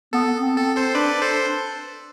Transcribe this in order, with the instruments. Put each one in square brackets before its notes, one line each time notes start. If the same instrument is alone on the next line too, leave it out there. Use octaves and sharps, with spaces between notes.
[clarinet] B3 [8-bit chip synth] A4
[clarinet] C4
[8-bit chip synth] A4
A4 C5
[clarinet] D4 [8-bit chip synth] B4 D5
[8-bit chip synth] A4 C5